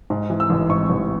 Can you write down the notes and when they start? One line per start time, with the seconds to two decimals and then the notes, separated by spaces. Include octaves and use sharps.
0.10 G#2
0.30 E3
0.40 E6
0.50 A1
0.69 G#2 C#6
0.90 A1